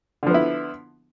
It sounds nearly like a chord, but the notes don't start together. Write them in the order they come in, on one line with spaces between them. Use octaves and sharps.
D3 F3 B3 E4